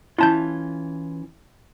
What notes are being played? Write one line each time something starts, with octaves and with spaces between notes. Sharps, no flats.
E3 C#4 E4 F4 A5 G6